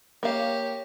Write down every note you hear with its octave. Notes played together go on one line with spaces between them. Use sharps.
A#3 G4 C#5 F5